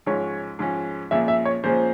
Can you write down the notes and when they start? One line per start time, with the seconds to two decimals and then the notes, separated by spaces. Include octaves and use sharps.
0.06 G#2 F3 G#3 C#4 C#5
0.59 G#2 F3 G#3 C#4
1.11 A#2 F3 G#3 C#4 E5
1.28 E5
1.45 C#5
1.64 A#2 F3 G#3 C#4 C5